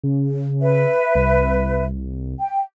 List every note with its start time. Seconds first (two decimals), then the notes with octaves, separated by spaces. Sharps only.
0.04 C#3
0.61 B4 E5
1.15 C2
2.40 G5